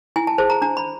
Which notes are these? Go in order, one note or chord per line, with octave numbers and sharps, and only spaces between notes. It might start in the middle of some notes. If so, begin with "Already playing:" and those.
E4 G#5
A5
G#4 C5 A5
A#5
D4 A#5
B5